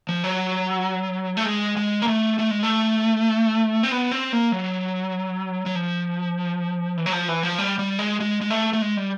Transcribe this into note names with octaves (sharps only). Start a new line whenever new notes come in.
F3
F#3
A3
G#3
G#3
A#3
A3
A3
G#3
A3
C4
B3
C4
A#3
F#3
F#3
F3
E3
F#3
F3
E3
F3
G3
G3
G#3
G#3
G#3
A3
A3
G#3
G3